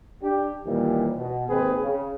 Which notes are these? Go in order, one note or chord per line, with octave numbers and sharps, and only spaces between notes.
D4 G4
D#2 A#2 E3 G3
B2
G#1 D#2 C4 G#4 B4
C#3